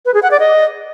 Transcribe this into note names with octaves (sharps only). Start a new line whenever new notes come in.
B4
G#4
F#5
D5
D#5